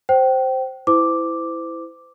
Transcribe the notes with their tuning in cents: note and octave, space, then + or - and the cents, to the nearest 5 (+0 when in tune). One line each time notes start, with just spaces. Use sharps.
C5 +0 G5 -25
E4 +0 C5 -40 D6 +0